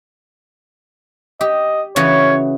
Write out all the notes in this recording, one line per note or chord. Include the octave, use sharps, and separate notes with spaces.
G4 D#5
C#3 E3 F#4 C#5